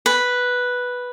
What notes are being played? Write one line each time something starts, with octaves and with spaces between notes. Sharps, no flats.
B4